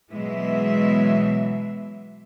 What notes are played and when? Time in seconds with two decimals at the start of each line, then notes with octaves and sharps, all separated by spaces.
0.12 B2 E3 F#3 G#3 E5